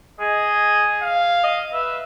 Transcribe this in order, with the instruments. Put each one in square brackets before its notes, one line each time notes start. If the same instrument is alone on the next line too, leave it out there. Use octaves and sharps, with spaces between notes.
[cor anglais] G#4 [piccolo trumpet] D#5
[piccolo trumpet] F5
[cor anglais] D#5
[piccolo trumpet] B4 [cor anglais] E5